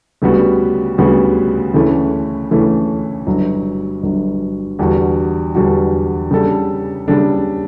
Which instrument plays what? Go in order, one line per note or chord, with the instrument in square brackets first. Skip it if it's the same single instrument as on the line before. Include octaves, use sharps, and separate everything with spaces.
[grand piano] D2 C#3 G3 B3 F#4
D2 C#3 G3 B3 F#4
D2 C#3 E3 A3 C#4
D2 C#3 E3 A3 C#4
G1 G2 F#3
G1 G2 F#3
E2 D3 G3 D4 F#4
E2 D3 G3 D4 F#4
C#3 G3 D4 A4
C#3 G3 D4 A4